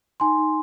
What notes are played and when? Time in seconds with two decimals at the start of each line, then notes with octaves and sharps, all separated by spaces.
0.20 D#4 G#5 C6
0.38 D#4